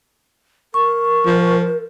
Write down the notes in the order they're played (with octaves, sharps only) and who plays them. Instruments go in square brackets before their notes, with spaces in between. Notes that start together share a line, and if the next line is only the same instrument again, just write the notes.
[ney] A#4 [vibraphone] C#6
[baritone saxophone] F3